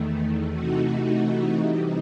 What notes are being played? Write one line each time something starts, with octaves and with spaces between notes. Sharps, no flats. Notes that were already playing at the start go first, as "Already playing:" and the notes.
Already playing: E2 D#3 A3
C3 E3 A3 D#4 F#4
C3 E3 G3 D#4